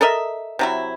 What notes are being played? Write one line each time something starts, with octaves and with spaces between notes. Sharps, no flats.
A4 A#4 D#5 E5
C3 F#3 E4